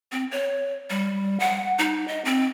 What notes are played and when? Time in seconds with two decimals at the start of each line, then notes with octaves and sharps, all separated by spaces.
0.12 C4
0.31 C#5
0.90 G3
1.40 F#5
1.79 D#4
2.08 D#5
2.25 C4